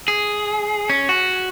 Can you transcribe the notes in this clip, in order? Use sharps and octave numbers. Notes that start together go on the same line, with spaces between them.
G#4
C#4
F#4